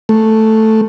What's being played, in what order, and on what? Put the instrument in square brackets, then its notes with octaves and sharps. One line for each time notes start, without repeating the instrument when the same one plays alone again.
[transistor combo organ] A3